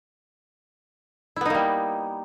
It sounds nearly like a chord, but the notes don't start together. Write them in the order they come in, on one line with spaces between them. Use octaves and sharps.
E4 B3 D#4 A#3 G3